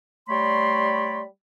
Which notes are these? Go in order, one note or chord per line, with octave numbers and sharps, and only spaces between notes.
G3 A3 C#5 D5 B5 C6